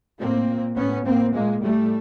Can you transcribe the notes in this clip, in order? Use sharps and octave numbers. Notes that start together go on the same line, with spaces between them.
A2 A#3 C4
A#2
A2 B3 C#4
A2 A#3 C4
A#2 G#3 A#3
A2 G3 A3